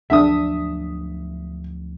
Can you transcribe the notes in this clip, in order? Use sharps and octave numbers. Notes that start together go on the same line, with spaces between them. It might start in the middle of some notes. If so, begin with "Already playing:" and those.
D2 F3 F#3 D4 E5 F#5 D#6